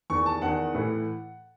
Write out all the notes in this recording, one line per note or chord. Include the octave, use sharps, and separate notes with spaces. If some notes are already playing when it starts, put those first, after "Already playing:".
E2 D#3 C#6
A5
E2 D#3 F#5
A2 E3